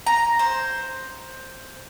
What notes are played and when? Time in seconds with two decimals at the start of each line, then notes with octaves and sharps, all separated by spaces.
0.07 A#5
0.39 C5